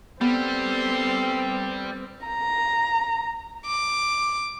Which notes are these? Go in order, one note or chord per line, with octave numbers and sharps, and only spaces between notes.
G3 B3 C4 A4 C6
A#5
D6